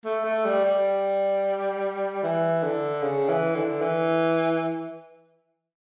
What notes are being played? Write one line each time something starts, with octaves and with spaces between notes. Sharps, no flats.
A3
A3
G3
G3
E3
D3
C#3
E3
D3
E3